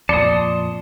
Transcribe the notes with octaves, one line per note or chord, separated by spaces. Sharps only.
F2 A#2 D5 A5 C6 D#6 C#7